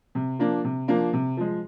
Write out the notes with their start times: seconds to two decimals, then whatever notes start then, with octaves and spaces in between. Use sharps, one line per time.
0.15 C3
0.39 F3 A#3 D4
0.64 C3
0.88 F3 A#3 D4
1.13 C3
1.37 F3 G#3